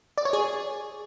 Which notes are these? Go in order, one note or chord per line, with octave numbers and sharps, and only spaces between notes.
D5
C#5
G#4